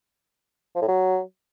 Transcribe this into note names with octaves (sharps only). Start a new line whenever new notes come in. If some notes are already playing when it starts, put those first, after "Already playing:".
F3
A2
F#3